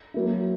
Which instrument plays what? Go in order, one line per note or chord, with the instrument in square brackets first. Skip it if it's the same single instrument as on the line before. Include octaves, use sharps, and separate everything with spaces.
[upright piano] F#3 A#3 E4